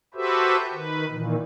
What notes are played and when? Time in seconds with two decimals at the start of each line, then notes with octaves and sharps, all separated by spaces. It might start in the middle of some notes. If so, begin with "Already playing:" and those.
0.14 F#4 G4 A4 B4 C5 E5
0.74 D#3 B4
1.09 A#2 D#3 E3